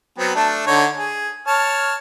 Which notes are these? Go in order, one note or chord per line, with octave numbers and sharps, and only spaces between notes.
F#3 B3 C4
A3 D4
D3 D#4 C#5
G#4
C#5 A5 F6